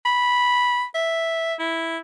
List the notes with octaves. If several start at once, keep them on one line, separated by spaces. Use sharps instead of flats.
B5
E5
E4